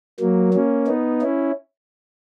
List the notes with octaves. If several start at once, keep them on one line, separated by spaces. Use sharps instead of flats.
F#3 A#3
A#3 C#4
B3 D#4
C#4 E4